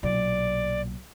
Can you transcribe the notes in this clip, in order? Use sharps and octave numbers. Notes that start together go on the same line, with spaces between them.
B1 A#2 D5